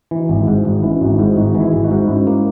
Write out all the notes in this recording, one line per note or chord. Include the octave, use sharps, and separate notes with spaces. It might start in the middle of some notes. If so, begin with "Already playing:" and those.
E3 E4
D#4 F#4
G#1
E4 G#4
G#2
E4
G#1 D#4 F#4
E3 C#4 E4
G#1 D#4 F#4
G#2 E4 G#4
G#1 D#4 F#4
E3
E4 G#4
G#1
D#4 F#4
G#2
G#2 C#4 E4
A#3